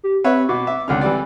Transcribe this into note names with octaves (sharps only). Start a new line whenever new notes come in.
G4
C4 B4 C#5 E5
B2 D6
E5
C#2 D3 C4 F6
E3 G3 D5